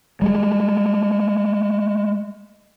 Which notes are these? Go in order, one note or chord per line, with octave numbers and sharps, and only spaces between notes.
G3 G#3